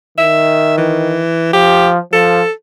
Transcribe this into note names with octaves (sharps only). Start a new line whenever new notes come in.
D#3 E5
E3
F3 G4
F3 A4